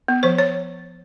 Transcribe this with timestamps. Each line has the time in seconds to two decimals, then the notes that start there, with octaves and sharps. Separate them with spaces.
0.08 B3
0.23 F3 C5
0.38 F3 C#5